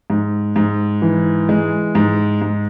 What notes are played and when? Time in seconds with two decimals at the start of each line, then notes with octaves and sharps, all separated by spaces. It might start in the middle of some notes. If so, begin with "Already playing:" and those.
0.10 G#2
0.56 G#2
1.02 E3
1.49 G#3
1.95 G#2
2.42 G#2